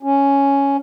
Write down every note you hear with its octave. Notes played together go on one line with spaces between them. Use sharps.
C#4